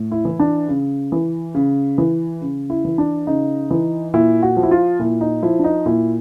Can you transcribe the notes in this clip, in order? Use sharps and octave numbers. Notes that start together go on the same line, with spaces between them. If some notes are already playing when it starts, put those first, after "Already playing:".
Already playing: A2
E4
E3
D4
C#3
E3
C#3
E3
C#3
E4
E3
D4
C#3 D#4
E3
A#2 E4
F#4
F3
E4
F4
A#2 E4
D#4
F3 E4
D4
D#4
A#2 E4